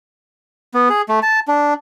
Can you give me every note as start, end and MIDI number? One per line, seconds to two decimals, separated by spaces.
0.74 0.89 59
0.90 1.02 68
1.09 1.20 57
1.23 1.40 81
1.48 1.74 62